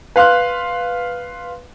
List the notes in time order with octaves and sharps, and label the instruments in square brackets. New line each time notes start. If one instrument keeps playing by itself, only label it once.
[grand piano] B4 F5 C6 F#6